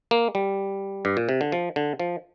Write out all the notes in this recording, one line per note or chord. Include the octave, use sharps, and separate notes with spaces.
A#3
G3
G2
A#2
C3
D3
F3
D3
F3